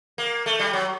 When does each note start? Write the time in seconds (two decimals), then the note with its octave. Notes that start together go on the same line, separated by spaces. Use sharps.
0.18 A#3
0.46 A3
0.59 G3
0.73 F#3